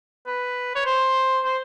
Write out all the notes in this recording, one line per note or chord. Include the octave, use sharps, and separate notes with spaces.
B4
C#5
C5
C5